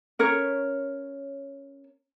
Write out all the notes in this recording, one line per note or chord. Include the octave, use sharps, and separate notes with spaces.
C#4 A#4 C#5